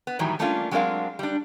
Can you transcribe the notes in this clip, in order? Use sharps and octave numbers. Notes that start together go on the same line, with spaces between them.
B3
A2 D#3 E3 F#3 G3
G3 A3 A#3 C#4 D4 F4
F#3 G#3 C4 D4 A#4 F5
G3 D4